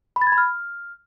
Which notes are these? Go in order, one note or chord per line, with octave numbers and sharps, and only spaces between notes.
B5
A6
G#6
B5
F6